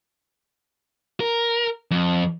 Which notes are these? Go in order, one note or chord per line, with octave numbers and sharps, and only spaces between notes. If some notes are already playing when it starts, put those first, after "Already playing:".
A#4
F2